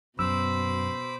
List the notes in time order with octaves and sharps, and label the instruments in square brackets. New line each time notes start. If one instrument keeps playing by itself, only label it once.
[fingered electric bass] F#2 [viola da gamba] B2 [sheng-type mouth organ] C5 B5 D6 [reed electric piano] E6